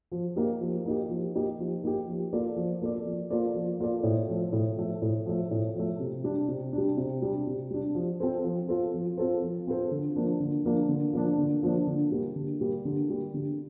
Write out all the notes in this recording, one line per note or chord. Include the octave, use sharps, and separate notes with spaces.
F3
A#3 D#4 G4
F3
A#3 D#4 G4
F3
A#3 D#4 G4
F3
A#3 D#4 G4
F3
A#3 F4 A4 D5
F3
A#3 F4 A4 D5
F3
A#3 F4 A4 D5
F3
A#3 F4 A4 D5
A2
F3 A3
A2
F3 A3
A2
F3 A3
A2
F3 A3
C3
G3 D4
C3
G3 D4
C3
G3 D4
C3
G3 D4
F3
C4 F4 A4 C5
F3
C4 F4 A4 C5
F3
C4 F4 A4 C5
F3
C4 F4 A4 C5
D3
F3 A#3 D4
D3
F3 A#3 D4
D3
F3 A#3 D4
D3
F3 A#3 D4
D3
G3 A#3
D3
G3 A#3
D3
G3 A#3
D3